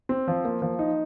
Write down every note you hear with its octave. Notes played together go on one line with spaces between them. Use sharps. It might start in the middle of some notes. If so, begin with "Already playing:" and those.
C4
F3
A#3
F3
D#4